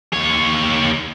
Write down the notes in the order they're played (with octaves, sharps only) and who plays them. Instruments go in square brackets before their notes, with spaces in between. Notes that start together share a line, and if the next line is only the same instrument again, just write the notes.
[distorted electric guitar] D#2 C#5